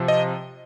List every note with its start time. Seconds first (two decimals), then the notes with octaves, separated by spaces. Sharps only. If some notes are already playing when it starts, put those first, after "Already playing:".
Already playing: C3 F3
0.08 D#5